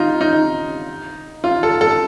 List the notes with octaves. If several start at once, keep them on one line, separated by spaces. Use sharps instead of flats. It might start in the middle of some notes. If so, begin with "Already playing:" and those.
Already playing: D#4 F4
D#4
F4
A4
A4